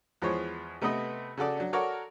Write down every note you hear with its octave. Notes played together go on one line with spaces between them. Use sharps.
E2 F3 G#3 C5 C#5
C3 A3 B3 B4 D#5 B5
C#3 F#4 A4 D5
F#3 D4
F#4 A4 A#4 C#5 D5